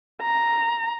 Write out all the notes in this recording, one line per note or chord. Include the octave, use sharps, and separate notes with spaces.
A#5